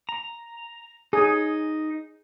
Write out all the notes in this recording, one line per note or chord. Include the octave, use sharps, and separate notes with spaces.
A#5
D#4 G#4